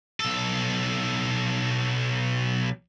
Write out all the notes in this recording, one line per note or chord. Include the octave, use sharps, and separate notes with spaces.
B1 A4